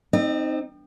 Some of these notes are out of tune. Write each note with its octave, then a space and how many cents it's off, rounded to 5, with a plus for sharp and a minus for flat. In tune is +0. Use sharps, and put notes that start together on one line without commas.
C4 +0 D#4 +5 D#5 -45